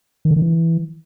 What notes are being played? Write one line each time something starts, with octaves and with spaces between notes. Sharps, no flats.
D#3
D3
D#3
E3